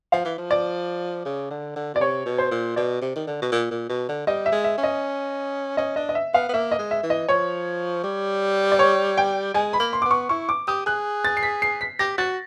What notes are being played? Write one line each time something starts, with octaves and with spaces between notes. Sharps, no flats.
F3 F5
E3
F3
D5
C#3
D3
D3
B2 D5
C3 C#5
B2
C5
A#2
B2 D5
C3
D#3
D3
B2
A#2
A#2
B2
D3
G3 D#5
E5
G#3
E5
C#4
D#5
C#4 D#5
D4 D#5
D#5
E5
B3 F5
B3
A#3 E5
D#5
G#3
E5
E3
D#5
F3 C#5
G3
D5
C#5
G5
G#3 G#5
B5
A#3
C6
B3 D6
C#6
E4 C#6
D6
G4 D#6
G#4 F#6
A6
C7
B6
C7
B6
G4 A#6
F#4 A6